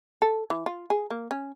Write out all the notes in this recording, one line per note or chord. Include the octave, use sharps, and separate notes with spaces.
A4
E3
F4
G#4
A#3
C#4